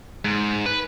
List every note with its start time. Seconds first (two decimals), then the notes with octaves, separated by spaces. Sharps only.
0.25 G#2
0.66 B4